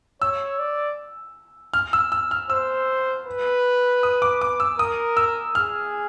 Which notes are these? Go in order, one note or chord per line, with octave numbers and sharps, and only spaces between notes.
C#5 E6
D5
F6
E6
E6
F6
C5 E6
B4
D#6
D6
D6
E6
A#4 D#6
E6
G#4 F6